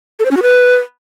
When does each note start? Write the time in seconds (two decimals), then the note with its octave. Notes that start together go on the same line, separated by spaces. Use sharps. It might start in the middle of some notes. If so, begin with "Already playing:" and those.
0.19 A4
0.25 C5
0.31 C#4
0.37 F#4
0.42 B4